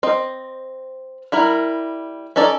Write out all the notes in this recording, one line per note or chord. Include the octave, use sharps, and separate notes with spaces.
C4 D#5
G3 E4 A#4
C#4 D#4 A4 D5